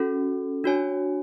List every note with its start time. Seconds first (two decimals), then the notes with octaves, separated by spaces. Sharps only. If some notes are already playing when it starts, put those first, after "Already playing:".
Already playing: C#4 F#4 A4
0.64 D4 F#4 C#5 G#5